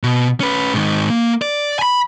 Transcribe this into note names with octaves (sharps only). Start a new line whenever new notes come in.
B2
C#4 B4
G#2 D#3
A#3
D5
G#5 B5